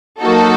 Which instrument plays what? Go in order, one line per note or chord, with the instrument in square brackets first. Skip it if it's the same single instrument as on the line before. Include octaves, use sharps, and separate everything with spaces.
[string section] F#3 A#3 D#4 F#4 A4